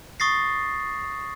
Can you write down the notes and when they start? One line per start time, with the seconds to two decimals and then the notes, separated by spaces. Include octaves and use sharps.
0.20 C#6 D#6 A6 A#6 C7